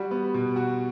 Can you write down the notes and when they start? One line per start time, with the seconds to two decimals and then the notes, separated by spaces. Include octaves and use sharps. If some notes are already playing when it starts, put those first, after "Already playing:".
Already playing: G3 F#4
0.11 B3
0.34 B2
0.56 F#4